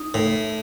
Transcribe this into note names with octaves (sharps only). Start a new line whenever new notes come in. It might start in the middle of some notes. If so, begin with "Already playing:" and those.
Already playing: D#4
A2